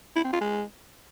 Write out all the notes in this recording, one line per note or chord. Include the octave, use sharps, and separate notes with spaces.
E4
C4
F4
G#3